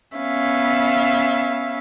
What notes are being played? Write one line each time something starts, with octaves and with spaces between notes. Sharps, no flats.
B3 C#4 E5 F5